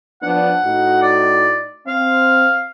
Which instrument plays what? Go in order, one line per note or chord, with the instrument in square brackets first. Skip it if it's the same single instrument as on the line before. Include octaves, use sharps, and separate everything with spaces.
[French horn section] F3 B3 D4 [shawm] F#5
[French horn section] A2 D#4 F#4
[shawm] D5
[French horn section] C4 [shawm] F5